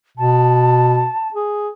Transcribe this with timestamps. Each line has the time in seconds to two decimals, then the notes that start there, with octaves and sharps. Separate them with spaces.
0.17 B2 A5
1.34 G#4